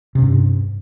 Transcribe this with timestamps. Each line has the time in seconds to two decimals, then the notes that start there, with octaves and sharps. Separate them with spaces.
0.15 C3
0.19 C#4
0.22 G2